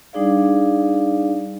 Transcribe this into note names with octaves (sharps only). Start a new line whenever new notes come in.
G3 D4 D#4 G#4 D5 F5